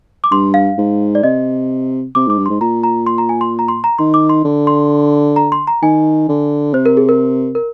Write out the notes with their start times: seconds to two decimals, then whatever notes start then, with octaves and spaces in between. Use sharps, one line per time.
0.24 D6
0.31 G2 C6
0.54 F5
0.78 G#2
1.15 D5
1.23 C3 D#5
2.15 C3 D6
2.27 G#2 D6
2.38 G2
2.46 G#2 C6
2.61 A#2 A#5
2.84 A#5
3.06 C6
3.18 A#5
3.29 G#5
3.41 C6
3.59 A#5
3.68 C6
3.84 A#5
3.99 D#3 C6
4.14 D6
4.29 C6
4.45 D3
4.67 C6
5.36 A#5
5.52 C6
5.67 A#5
5.82 D#3 G#5
6.29 D3
6.74 C3 C5
6.86 A#4
6.97 G#4
7.09 A#4
7.55 A#4